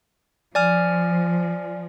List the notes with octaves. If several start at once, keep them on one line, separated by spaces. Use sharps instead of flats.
F3 D5 G#5 F6